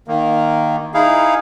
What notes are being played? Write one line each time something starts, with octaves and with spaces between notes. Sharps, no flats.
D#3 A#3
D#4 E4 G#4 F5